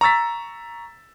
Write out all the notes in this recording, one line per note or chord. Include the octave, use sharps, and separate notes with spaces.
A#5 C#6 E6 A6 B6